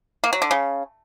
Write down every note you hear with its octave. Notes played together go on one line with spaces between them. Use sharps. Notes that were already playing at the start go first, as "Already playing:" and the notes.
A#3
F#3
D3
C#3